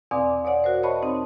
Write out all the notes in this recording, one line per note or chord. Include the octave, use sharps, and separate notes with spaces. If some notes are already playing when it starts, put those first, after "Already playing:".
E2 B2 C4 D5 F5 D6
B2 C#5 D5 F#5
F#4 A#4 C5
C#5 D#5 E5 A5 B5 C#6
C4 D#4